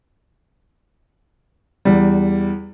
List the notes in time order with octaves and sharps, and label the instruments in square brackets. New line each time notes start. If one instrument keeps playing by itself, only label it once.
[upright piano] E2 G3